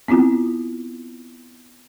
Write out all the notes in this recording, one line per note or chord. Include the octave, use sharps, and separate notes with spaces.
B3 C4 E4 F4